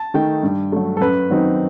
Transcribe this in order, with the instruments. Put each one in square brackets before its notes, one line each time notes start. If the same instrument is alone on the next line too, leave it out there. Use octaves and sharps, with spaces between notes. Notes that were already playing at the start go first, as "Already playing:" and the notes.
Already playing: [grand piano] A5
D#3 A3 D#4 G5
G2
F#3 A3
A4
F#2 B4
D#3 F#3 C4 D#4